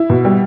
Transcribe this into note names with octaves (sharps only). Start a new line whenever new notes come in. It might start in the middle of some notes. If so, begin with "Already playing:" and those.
Already playing: E4
B2
G3